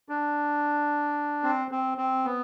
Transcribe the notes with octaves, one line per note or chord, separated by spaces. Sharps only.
D4
C4
C4
C4
B3